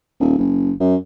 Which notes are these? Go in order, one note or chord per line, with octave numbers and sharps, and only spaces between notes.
D#1
F#1
F#2